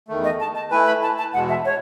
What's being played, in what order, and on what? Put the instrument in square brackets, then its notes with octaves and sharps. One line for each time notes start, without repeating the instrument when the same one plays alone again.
[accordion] E2 D#3 A3
[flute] D#5
A5
A5
[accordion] A3 E4 B4 [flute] G#5
[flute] B5
A5
A5
[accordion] E2 B2 G#3 [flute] F#5
[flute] E5
C#5